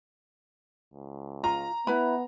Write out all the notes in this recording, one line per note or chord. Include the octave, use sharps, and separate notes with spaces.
C#2
F4 A#5
B3 E4 B4 B5